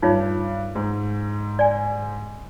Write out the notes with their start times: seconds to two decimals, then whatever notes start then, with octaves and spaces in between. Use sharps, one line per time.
0.02 G2 D#4 F4 C#5
0.75 G#2
1.59 D5 G#5